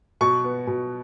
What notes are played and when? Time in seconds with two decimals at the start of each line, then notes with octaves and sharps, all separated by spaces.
0.21 B2 C#6
0.44 B3
0.67 B2